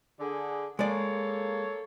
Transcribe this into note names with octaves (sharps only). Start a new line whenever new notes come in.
D3 G#4
G#3 A#3 A4 C#5 D5